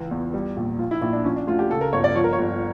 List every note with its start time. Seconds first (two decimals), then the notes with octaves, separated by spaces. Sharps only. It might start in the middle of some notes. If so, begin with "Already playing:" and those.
Already playing: C#2 E3
0.11 E2
0.34 G3
0.57 A#1
0.79 F3 F4
0.91 E4
1.02 A#1 E4
1.13 D4
1.24 F3 C#4
1.36 D4
1.47 D2 F4
1.59 G4
1.70 C#3 A4
1.81 A#4
1.93 G1 C#5
2.04 D5
2.16 F3 C#5
2.24 A#4
2.33 C#5
2.39 G1